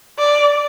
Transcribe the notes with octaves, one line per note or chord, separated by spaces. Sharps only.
D5